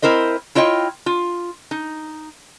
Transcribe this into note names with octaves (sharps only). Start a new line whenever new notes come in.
C4 E4 A#4 C5 D#5
E4 F4 C#5 D#5 G5
F4
D#4